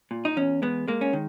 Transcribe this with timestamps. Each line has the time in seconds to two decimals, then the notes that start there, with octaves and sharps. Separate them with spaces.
0.11 A#2
0.25 D#4
0.37 E2 C#4
0.62 G#3 B3
0.88 G#3 A#3
1.01 C#4
1.13 D#3